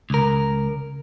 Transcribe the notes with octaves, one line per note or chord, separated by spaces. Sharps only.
C#2 A#4